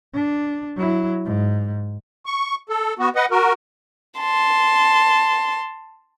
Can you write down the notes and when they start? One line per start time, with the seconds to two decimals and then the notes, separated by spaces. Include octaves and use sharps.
0.14 D4
0.77 F#3 E4
1.25 G#2
2.26 C#6
2.69 A4
2.99 B3 F#4
3.15 B4 D#5 F#5
3.31 F#4 A#4
4.20 A5 C6